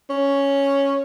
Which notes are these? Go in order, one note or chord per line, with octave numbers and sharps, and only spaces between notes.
C#4